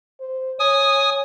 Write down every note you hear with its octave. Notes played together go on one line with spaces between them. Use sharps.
C5
C#5 G#5 D#6